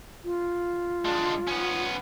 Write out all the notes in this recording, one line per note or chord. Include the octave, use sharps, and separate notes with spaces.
F4
G#3 D4
B3 C#4